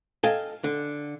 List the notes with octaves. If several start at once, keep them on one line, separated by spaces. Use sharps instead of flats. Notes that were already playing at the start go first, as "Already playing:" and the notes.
A4 D#5 F5 G5 G#5
D3